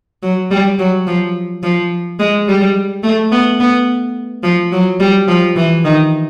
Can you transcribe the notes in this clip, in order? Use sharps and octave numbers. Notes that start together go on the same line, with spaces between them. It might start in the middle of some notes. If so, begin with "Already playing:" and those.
F#3
G3
F#3
F3
F3
G#3
G3
A3
B3
B3
F3
F#3
G3
F3
E3
D#3